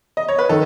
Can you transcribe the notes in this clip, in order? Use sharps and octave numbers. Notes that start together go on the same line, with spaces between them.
D#5
C#5
B4
D#3 A4